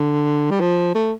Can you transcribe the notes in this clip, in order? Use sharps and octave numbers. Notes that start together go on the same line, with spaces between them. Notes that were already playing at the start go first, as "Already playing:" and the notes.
Already playing: D3
G3
F3
A3